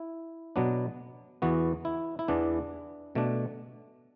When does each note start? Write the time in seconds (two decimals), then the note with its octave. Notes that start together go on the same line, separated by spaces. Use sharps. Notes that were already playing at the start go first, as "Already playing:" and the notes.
Already playing: E4
0.56 B2 F#3 B3 D4
1.42 E2 E3 B3 F#4
1.85 E4
2.19 E4
2.28 E2 E3 B3 D4
3.15 B2 A3 D4